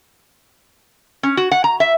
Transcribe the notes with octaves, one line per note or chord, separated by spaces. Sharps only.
C#4
F#4
F#5
A#5
E5